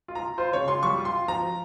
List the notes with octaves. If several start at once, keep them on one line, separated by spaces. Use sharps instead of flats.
F4
A#5
F4
F4 C5
C#3 C#5
F4 C6
G3 C#6
F4
C6
F4
F3 A#5
F3